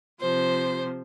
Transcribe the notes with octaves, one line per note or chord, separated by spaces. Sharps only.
C3 F3 C5